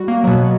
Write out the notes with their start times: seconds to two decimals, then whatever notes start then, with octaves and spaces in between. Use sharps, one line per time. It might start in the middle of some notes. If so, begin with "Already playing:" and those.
Already playing: G3 F#4
0.08 A#3
0.24 B2 F#3